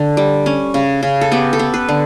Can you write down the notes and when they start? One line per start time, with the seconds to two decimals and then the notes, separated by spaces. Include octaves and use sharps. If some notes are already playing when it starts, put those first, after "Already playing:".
Already playing: D3
0.17 G3
0.46 C#4
0.74 C#3
1.03 C#3
1.21 A4
1.32 B3 G4
1.53 A4
1.59 B3
1.74 B4
1.89 D3